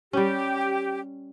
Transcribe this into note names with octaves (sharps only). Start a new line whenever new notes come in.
G3 C#4 G4